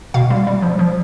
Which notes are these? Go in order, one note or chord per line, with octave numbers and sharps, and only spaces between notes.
B2 F5
G3
G3
F3
F3